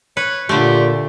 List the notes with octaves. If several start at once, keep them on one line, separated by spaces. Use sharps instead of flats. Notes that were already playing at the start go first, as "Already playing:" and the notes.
B4 C#5
A#2 D3 A3 G4